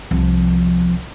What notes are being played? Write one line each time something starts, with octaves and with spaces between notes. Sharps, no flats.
C2 F3